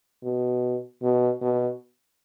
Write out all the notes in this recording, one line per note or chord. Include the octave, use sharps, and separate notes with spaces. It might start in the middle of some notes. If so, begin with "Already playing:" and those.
B2
B2
B2